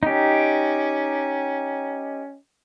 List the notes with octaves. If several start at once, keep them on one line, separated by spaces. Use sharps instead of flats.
C#4 D#4 G4